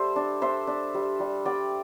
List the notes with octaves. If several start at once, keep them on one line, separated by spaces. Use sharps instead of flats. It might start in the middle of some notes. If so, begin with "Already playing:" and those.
Already playing: G3 A4 C5 E5
D4
D4 C5 E5
D4
G3
G3
G3 D5 G5